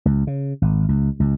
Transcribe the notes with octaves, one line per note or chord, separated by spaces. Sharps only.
C#2
C#3
G#1
C#2
C#2